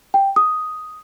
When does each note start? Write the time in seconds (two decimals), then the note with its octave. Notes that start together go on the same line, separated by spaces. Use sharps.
0.14 G5
0.36 D#6